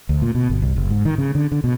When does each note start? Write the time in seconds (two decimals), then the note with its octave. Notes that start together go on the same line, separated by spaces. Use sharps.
0.09 D2
0.22 A#2
0.35 B2
0.50 G1
0.62 C2
0.76 F#1
0.90 G#2
1.05 D#3
1.18 C#3
1.35 D3
1.52 D3
1.64 B2